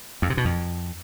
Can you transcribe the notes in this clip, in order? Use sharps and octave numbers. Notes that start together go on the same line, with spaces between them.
F2
C3
B2
F2